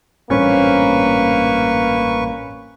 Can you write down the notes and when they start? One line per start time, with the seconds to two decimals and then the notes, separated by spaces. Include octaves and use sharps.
0.30 A1 G2 A#2 A#3 C4 C#4 B4 C#6